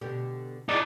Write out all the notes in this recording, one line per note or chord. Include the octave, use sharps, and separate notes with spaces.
B2 D3 G4
D#4 E4 G#4 D5 D#5